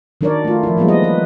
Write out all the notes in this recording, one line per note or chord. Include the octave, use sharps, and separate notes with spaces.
D#3 F#3 D4 A#4 C#5 D5
A3 F4
F3 E4
E3 F3 G3 G#3 A#3 B3
D#5
B4